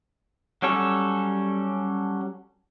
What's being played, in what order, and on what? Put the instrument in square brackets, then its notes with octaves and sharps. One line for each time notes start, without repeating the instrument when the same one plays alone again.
[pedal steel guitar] F#3 G3 C#4 A4 C#5